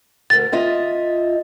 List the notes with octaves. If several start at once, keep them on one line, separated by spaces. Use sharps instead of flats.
D2 A#4 A6
F4 D#5 E5